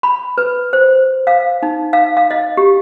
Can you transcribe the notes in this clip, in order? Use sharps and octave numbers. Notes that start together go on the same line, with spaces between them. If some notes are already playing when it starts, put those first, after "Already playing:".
B5
B4
C5
F5
D#4
F5
F5
D#5
G4